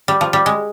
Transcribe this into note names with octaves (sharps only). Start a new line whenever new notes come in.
G3
F3
G3
G#3